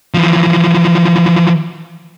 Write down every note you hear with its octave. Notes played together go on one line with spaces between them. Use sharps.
E3 F3